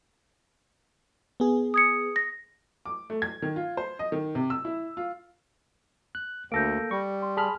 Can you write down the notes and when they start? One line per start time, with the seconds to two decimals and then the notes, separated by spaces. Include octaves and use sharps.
1.40 B3 G#4
1.74 D#6 G#6 C#7
2.16 A#6
2.85 D6
3.10 A3
3.22 G#6
3.42 D#3
3.56 F4
3.77 C5
3.99 D#5
4.12 D#3
4.35 C3
4.50 E6
4.65 E4
4.97 F4
6.15 F#6
6.52 D2 A#3 A4 G6 A#6 D7
6.91 G3 C#6
7.22 C6
7.37 G#4 A5 B5 C6 F6